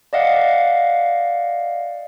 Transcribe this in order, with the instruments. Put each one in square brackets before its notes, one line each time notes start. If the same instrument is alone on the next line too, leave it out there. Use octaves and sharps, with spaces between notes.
[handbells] D5 D#5 F5 F#5